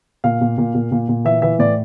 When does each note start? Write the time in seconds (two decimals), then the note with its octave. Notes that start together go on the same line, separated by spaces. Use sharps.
0.24 A#2 F5
0.41 A#2
0.58 A#2
0.75 A#2
0.91 A#2
1.08 A#2
1.25 E3 E5
1.42 E3 E5
1.59 A2 D5